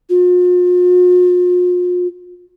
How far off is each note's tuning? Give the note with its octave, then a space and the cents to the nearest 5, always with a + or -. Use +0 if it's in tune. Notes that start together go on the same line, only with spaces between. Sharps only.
F4 +45